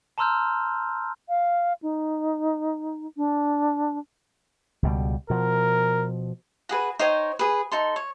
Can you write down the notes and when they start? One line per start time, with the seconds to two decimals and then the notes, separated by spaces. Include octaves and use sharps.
0.18 A5 A#5 C6 E6 F6 G6
1.29 F5
1.82 D#4
3.17 D4
4.83 C#2 B2 G3
5.30 B2 F3 A#4
6.69 F#4 G#4 B4
6.99 D#4 C5 C#5 G5
7.39 G#4 B4
7.72 D#4 A4 C6
7.96 C#5